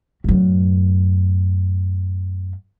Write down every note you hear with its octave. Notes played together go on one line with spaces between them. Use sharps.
F#2 A2